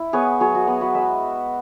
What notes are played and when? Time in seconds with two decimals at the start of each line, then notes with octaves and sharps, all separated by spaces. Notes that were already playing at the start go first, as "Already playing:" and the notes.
Already playing: E4
0.13 B3 G#4 C#5
0.41 F#3 G#4 C#5
0.55 F#4
0.67 B3 G#4
0.81 F#4 B4
0.95 G#3 B4 E5